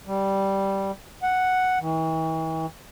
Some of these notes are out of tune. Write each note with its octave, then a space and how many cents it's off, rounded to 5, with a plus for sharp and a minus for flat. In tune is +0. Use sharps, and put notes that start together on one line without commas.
G3 -5
F#5 +0
E3 -40